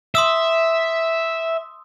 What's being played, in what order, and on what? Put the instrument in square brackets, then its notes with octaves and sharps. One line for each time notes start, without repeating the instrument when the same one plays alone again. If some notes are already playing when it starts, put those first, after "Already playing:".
[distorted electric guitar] E5 [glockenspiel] C6 D#6 E6